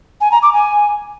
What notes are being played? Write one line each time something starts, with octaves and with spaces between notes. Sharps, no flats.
G#5
A#5
D6
G#5